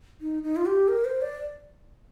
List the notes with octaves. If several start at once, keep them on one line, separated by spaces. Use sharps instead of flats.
D#4
D#4
F4
G4
A#4
C5
D5